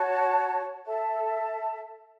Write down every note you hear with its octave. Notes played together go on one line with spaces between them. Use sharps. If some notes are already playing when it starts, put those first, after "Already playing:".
Already playing: F#4 C#5 F#5 A5
A4 E5 A5